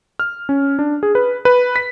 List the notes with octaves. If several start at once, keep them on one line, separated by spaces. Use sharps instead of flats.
F6
C#4
D4
G#4
B4
B4
B6